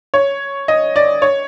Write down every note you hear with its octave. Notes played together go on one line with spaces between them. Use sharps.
C#5
D#5
D5
C#5